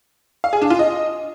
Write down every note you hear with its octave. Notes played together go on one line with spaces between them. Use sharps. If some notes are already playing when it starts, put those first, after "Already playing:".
F5
G#4
D4
F4
D#5